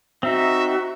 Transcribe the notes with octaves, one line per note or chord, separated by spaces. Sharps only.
C4 D#4 F#4 E5